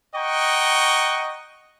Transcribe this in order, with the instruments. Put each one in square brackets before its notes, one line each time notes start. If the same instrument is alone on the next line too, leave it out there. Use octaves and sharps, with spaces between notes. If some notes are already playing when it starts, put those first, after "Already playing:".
[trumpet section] D#5 F#5 G5 A#5 C#6